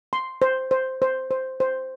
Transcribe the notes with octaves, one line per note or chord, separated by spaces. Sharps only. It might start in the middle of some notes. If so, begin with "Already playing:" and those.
C6
C5
C5
C5
C5
C5